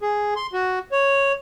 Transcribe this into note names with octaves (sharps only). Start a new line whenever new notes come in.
G#4
C6
F#4
C#5